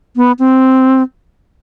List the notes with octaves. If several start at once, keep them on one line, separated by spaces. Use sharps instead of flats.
B3
C4